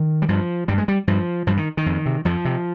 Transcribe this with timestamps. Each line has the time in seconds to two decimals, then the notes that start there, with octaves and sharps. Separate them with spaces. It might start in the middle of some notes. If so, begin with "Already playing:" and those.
Already playing: D#3
0.22 G3
0.28 G2 F3
0.68 G2 G3
0.78 G#3
0.88 G3
1.08 G2 F3
1.47 G2 F3
1.57 D#3
1.77 D#3
1.86 F2
2.06 C3
2.25 F2 F3
2.45 C3